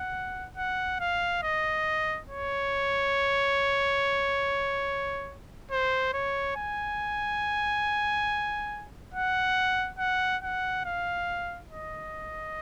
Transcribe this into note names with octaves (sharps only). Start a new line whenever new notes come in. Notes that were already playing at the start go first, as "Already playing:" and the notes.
Already playing: F#5
F#5
F5
D#5
C#5
C5
C#5
G#5
F#5
F#5
F#5
F5
D#5